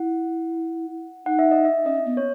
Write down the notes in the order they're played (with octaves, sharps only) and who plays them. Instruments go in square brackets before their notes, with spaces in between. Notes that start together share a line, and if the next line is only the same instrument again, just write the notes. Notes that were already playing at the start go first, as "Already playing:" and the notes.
Already playing: [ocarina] E4 [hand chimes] F#5
[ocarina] D#4 [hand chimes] F#5
[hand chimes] E5
D#5
E5
[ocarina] C#4 [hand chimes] D#5
[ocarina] B3
[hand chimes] C#5